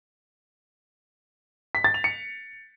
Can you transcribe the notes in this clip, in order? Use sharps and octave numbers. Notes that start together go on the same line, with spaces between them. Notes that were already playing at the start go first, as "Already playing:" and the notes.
B6
A6
F7
C#7